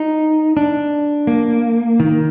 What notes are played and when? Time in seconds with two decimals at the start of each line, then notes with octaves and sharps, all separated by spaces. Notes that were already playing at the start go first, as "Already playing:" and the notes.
Already playing: D#4
0.57 D4
1.27 A#3
2.00 D#3